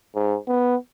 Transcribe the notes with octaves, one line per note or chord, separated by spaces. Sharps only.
G#2
B3